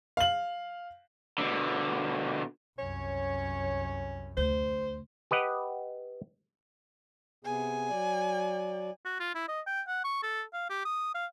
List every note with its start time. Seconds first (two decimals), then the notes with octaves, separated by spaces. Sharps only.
0.17 F5 F#7
1.38 B2 D3
2.79 C2 F#2 C#4 C#5
4.37 D2 C5
5.31 G4 B4 D#5 F#5
7.45 C3 B3 G#4 G#5
7.89 F#3 D5
9.05 F#4
9.20 F4
9.35 E4
9.48 D#5
9.67 G5
9.88 F#5
10.04 C#6
10.23 A4
10.53 F5
10.69 G4
10.85 D#6
11.15 F5